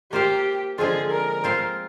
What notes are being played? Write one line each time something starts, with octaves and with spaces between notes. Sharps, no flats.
A#3 F4 G4 C5 F5
D3 F3 G#3 C4 F4 G#4
A#4
C4 F4 C5 F5